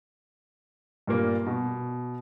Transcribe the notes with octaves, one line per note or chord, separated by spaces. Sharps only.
G2 A#2 A#3
B2